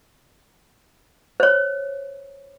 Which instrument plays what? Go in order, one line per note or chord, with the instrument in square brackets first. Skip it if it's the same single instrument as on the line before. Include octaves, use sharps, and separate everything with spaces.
[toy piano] C5 C#5